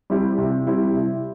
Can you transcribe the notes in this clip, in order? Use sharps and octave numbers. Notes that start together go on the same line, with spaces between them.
G3 C4 E4 G4
C3
G3 C4 E4 G4
C3